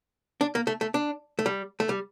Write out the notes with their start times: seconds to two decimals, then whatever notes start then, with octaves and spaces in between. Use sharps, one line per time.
0.41 D4
0.55 A#3
0.67 A3
0.81 A3
0.94 D4
1.39 A3
1.46 G3
1.80 A3
1.89 G3